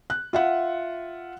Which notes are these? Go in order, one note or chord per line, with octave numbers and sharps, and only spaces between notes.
F#6
F4 E5 F#5